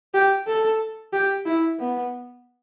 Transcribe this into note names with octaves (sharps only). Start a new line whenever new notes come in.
G4
A4
G4
E4
B3